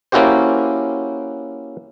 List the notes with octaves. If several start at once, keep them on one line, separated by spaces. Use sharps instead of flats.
A#3 C#4 E4 F#4 G4 C5